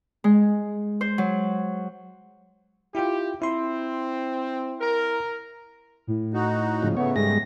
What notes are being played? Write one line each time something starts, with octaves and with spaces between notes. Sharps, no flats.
G#3
C5
F#3
E4 F4 G4
C4 E4 C6
A#4
A2
D#4 F#4
G#2 C#3 F3
C#3 A3 B3 C#5
G#2 G3 G#3 A#6